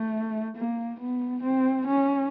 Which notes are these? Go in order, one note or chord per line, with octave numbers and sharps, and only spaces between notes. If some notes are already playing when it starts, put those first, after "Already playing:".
Already playing: A3
A#3
B3
C4
C#4